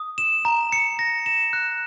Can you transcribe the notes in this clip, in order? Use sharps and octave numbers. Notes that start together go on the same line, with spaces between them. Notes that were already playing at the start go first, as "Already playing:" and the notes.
Already playing: D#6
E7
A#5
C#7
A#6
E7
F#6